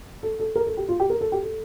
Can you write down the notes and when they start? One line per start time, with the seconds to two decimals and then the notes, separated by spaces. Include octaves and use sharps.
0.23 A4
0.40 A4
0.55 A#4
0.67 A4
0.77 G4
0.89 F4
1.00 G4
1.10 A#4
1.21 A4
1.32 G4
1.43 A4